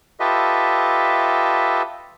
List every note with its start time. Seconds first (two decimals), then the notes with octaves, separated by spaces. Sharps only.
0.20 F4 G4 A4 B4 D#5 E5